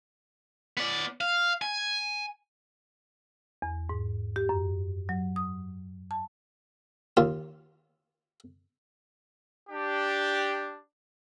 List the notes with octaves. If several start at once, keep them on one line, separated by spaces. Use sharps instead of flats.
B3 D5
F5
G#5
E2
G#2
G4
F#2
F#3
D#6
A5
D#2 F4
D4 G4